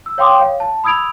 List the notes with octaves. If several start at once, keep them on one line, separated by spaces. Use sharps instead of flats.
E6
C#5 F5 G5 C6 D6 D#6
C#5 F5
A5
B5 D#6 E6 G#6 D7 F7